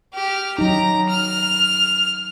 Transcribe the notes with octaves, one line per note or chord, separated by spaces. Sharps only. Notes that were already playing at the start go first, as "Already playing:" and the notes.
G4 F6
F#3 D#4 A#5
F6